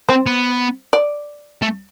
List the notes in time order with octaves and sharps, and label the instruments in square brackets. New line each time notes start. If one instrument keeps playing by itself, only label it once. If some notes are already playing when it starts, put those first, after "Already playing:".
[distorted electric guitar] C4 [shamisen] C5
[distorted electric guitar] B3
[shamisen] D5
[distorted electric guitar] A3